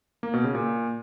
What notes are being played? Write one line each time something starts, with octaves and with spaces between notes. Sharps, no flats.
A#3
B2
C#3
A#2